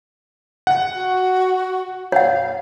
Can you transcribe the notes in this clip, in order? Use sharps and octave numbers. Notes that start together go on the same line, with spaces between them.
F#5
F#4
C#5 F5 F#5